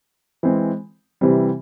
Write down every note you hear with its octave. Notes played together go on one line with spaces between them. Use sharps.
E3 G#3 C4
C3 E3 G3 C4